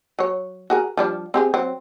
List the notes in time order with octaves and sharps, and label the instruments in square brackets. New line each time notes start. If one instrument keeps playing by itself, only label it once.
[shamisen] F#3 C#5
F#4 G#4 A#4
F3 G3 D4
C4 G4 G#4
F#3 C4